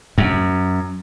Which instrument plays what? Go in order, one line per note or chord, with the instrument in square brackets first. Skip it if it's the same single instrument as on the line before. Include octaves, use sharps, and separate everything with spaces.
[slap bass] F#2